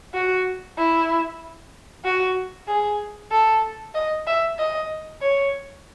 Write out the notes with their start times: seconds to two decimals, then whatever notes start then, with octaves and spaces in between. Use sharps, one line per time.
0.14 F#4
0.78 E4
2.05 F#4
2.68 G#4
3.31 A4
3.95 D#5
4.27 E5
4.59 D#5
5.22 C#5